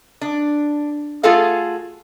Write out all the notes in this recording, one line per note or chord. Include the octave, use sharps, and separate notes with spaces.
D4
A3 F4 F#4 G#4 A4 F5